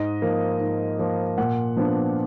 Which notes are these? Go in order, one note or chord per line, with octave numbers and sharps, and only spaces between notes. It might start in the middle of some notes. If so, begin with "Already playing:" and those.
Already playing: G#2 D#5
F3 A#3
G#2
F3 A#3
A#2 F#5
F3 B3 D4